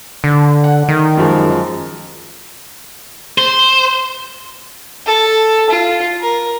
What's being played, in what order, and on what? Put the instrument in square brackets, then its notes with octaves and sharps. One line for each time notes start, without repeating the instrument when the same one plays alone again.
[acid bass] D3
[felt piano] F#5
[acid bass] D#3
[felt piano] F#2 F3 G#3
[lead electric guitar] C5
[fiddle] A4
F4
A#4